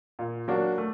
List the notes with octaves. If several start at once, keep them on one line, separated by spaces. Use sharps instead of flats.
A#2
F#3 A#3 D4 F#4
A3